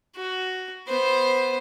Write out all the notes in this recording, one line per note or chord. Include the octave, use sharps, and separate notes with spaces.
F#4
B3 C5